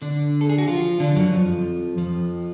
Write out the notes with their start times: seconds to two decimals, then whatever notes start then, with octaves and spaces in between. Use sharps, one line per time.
0.02 D3 D4
0.41 A4
0.50 G#4
0.58 F#4
0.68 F3 F4
1.00 D3 D4
1.16 F#2 F#3
1.32 F2 F3
1.97 F2 F3